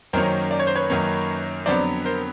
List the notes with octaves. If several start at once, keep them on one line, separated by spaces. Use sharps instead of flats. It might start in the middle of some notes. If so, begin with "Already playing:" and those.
F#2 D#3 F#3 A#3 C#4 A#4 C5
D5
C#5
C5
B4 C#5
F#2 D#3 F#3 A#3 C#4
F2 D3 F#3 B3 C5 D5
A#4 C5